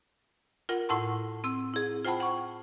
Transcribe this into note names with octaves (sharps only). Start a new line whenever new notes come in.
F4 A#4 F#5
A2 E4 F#5 A5 C6
C4 E6
E4 G#4
F4 C5 F#5 G5 A5 B5
F#5 C#6